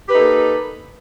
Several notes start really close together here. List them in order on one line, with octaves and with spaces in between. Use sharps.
G4 B4 D#4 A4 A#3